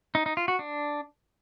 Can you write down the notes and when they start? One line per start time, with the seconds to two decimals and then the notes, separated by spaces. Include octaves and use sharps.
0.15 D#4
0.26 D#4
0.37 F4
0.48 F#4
0.59 D4